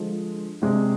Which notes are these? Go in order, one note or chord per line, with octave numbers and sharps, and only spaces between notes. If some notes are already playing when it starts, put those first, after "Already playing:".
Already playing: D3 F3 G#3
C3 G#3 D4